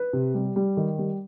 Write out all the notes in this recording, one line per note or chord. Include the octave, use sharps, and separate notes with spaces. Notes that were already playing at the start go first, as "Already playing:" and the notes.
Already playing: B4
C3
G3
G3
D#3
G3